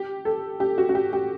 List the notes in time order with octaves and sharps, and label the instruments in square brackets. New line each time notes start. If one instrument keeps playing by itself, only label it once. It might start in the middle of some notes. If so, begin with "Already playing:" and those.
Already playing: [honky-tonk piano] G4
A4
G4
F#4
F#4
G4
G4